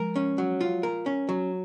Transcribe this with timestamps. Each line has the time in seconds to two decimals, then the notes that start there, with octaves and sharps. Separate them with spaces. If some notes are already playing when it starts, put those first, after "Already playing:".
Already playing: F3 G#3 A#4
0.16 C#4
0.38 F#3
0.61 F4
0.83 A#4
1.06 C#4
1.29 F#3